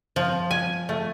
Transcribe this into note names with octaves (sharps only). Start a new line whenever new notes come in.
F3
G#5
A3